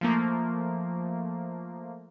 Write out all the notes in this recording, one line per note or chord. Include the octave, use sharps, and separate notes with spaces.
F3 A3 A#3